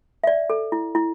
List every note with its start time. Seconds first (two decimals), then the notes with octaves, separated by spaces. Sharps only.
0.24 E5
0.27 D5
0.50 A4
0.72 E4
0.95 E4